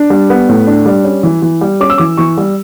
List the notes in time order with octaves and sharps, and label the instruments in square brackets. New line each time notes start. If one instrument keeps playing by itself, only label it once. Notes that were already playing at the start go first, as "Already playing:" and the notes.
Already playing: [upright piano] D4
G3
B3
A2
D4
G3
C#4
E3
E3
G3
C#4 D6
E6
E3 D6
E3 C#6
G3